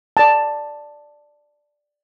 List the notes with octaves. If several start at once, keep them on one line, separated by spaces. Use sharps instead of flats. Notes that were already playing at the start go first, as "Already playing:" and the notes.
D5 A5